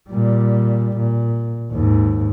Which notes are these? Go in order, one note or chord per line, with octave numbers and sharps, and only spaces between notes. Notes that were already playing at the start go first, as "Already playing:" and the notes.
A#2 G3
A#2
D#2 G#2